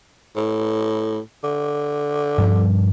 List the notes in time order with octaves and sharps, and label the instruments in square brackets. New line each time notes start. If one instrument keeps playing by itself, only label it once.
[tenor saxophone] A2
D3
[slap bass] G2 F3 G3